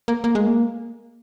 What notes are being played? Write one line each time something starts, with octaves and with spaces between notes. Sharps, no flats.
A#3
A#3
G#3
A#3